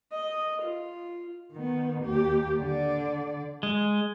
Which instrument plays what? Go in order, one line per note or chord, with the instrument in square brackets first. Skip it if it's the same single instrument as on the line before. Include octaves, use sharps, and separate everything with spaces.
[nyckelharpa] D#5
F4
[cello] D#3 B3
D#2 G4
D3 D5
[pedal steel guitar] G#3